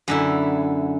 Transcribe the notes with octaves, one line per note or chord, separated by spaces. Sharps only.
F#2 D3 E4